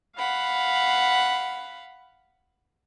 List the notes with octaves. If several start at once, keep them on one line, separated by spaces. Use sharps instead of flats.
F5 F#5 B5